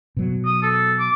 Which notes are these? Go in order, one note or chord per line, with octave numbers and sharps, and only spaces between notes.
B2 F#3
D#6
A4
D6